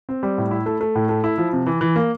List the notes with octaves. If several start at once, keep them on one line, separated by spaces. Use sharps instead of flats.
C4
G3
A2
E4
A3
A3
A2
A3
E4
F3
C3
E3
E3
A#3